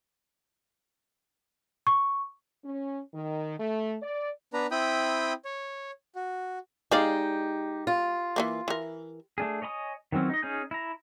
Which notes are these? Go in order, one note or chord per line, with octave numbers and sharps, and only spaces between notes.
C#6
C#4
D#3
A3
D5
B3 D4 B4 A#5
C4 E4 G5 B5 D#6
C#5
F#4
G#3 D#4 G4 D5 F5
F4
E3 G#3 A#3
E3 A#4
A3 D4 G#4
C#5 D#5 G#5 B5 D#6
D#3 E3 F#3 C4 C#4
D#4 D#5
C#4 D#4 G#4 G6
E4 A#5